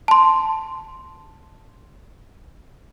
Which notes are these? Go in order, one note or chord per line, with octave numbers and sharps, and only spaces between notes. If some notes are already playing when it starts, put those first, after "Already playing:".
A5 C6